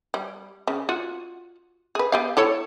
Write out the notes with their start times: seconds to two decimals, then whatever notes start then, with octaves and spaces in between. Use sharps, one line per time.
0.14 G3
0.67 C#3
0.89 F4 F#4
1.95 G#4 B4
2.12 B3 G4 F5
2.37 E4 A4 C#5